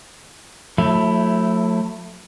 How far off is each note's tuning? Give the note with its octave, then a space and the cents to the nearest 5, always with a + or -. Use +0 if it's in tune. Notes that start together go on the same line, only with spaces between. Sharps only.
F#3 -40 A3 +15 E4 +0